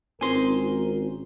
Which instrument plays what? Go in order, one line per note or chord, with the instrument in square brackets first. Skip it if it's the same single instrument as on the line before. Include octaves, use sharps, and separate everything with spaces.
[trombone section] G#1 A#4 [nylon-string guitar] C4 [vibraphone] C#4 D#4 F4 [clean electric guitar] G#5 C6